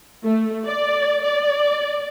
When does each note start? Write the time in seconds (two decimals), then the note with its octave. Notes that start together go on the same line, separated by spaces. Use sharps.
0.24 A3
0.65 D5
1.23 D5